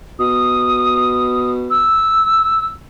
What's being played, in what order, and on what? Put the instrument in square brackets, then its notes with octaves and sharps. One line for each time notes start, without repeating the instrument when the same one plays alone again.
[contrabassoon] B2 [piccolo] D#6
[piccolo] E6